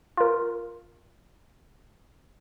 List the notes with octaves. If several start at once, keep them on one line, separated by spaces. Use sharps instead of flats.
F4 A#4